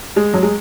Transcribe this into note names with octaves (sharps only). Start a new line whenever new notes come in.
G#3
F#3
G#3